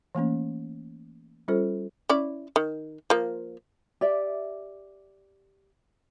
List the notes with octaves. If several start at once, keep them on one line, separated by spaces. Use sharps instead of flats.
E3 A3 A#3 C#4
G3 C#4 F4 A4 C5
C#4 E4 D5
D#3
F3 A#3
G4 D5 E5